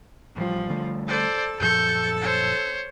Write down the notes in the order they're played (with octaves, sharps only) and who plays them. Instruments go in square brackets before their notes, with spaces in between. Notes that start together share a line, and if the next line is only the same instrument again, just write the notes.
[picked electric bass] A1 G3 [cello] F3
[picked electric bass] D3 G3 A3
[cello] A4 [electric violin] C5 D5
[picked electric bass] F#2 A#2 F3 [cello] A4 [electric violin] C#6 G6
[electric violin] C5 C#5